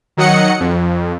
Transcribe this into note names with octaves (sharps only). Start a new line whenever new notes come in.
D#3 F#3 D#5 F#5 C#7
F2